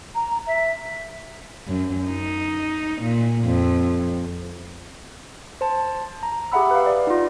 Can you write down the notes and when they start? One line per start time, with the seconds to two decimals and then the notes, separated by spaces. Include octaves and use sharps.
0.14 A#5
0.46 E5
1.67 F#2
2.08 D#4
3.02 A#2
3.45 F2
5.61 C5 A5
6.23 A#5
6.52 G4 G#4 E5 F#5 B5 E6
6.71 B4 F5
6.86 D5
7.07 D#4 F4